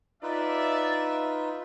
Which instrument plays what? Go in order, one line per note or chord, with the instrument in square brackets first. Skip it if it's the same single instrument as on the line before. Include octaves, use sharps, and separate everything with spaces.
[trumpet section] D4 D5 E5 [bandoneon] D#4 F4 B4